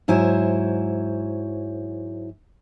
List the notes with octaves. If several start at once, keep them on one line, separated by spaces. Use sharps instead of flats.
G#2 F#3 E4 C5 C#5 G#5